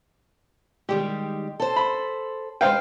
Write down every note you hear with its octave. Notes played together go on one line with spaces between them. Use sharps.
D#3 G3 G#3 G4
A4 C5
B5
G#3 D#4 B4 C5 F5 G5